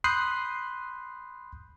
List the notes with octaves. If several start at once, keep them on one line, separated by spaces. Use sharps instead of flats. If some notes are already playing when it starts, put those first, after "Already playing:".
B5 C6 D#6 F#6 G6 C7